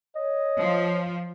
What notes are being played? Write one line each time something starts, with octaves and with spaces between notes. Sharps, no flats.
C#5 D#5
F3